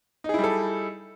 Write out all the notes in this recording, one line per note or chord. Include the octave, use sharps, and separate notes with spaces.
G3 D#4 E4 G#4 A4